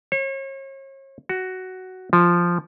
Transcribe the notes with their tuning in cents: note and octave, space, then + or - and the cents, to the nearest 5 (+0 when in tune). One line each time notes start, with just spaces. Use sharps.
C#5 -40
F#4 +10
F3 -5